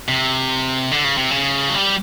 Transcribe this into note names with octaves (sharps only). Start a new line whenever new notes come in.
C3
D3
C#3
C3
C#3
F#3
G3